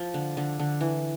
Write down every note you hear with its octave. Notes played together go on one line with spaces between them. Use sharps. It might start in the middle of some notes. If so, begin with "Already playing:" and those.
Already playing: F3
D3
D3
D3
E3